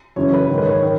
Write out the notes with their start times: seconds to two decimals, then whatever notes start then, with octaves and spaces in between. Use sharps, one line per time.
0.16 F#2 C#3 E3 C#5
0.33 B4
0.49 G#2 D#3 C#5
0.58 B4
0.66 C#5
0.83 D#3